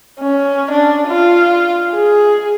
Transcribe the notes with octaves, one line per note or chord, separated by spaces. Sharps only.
C#4
D4
F4
G#4